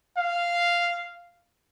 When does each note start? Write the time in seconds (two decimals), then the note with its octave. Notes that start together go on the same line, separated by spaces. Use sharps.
0.17 F5